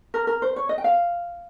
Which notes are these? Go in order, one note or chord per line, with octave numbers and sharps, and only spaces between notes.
A#4
A#4
C5
C#5
D#5
G5
F5